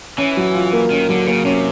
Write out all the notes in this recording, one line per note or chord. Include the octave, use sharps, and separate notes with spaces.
E3 C#4
F#3
F4
A#3
D#3 C#4
D3 F#3
C#3 A#3
C3 C#4